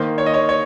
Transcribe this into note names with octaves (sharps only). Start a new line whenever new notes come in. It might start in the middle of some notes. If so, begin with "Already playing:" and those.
Already playing: D#3 A#3 D#4 C5
C#5
D#5
C#5
C#5